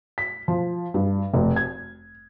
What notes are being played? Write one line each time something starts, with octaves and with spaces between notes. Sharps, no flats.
B6
F3
G2
F1
G#6